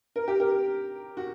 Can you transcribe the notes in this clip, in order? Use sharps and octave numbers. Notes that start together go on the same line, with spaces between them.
A#4
G4
A#4
F#4